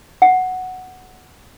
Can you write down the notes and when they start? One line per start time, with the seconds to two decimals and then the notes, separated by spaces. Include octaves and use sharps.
0.22 F#5